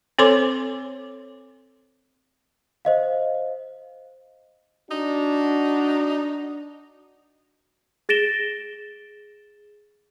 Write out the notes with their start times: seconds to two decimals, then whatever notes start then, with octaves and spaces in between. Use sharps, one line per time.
0.18 C4 A4 C5 C#5 C6 D6
2.85 C5 D#5 F5
4.91 D4 D#4 F#4
8.09 G#4 A6 A#6 D7 E7 G7